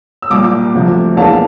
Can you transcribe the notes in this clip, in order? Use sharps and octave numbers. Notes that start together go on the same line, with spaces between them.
E6
C2 A#2 G3 A#5 D6
D2 C3 F3
E2 E3 A#3 D4 F5 A5